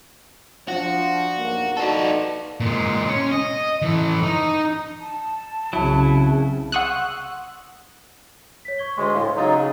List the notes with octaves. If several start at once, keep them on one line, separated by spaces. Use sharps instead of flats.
F3 D4 F#4
B1 G2 A#3
D#4 F#4 A4 B4 D5
A#2 G#3
C#4
D#5
E3 A4
D#4
A5
C2 C#3 F#3 E4
F#5 C6 C#6 D#6 E6 F#6
C#5 B6
C#6 G#6 G7
D2 G#3 C6 C#6
A2 A4 F5
C#3 F#3 D#4 C#5 F5 A6
C#3 F5 A#5